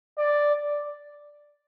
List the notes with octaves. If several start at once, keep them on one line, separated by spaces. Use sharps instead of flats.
D5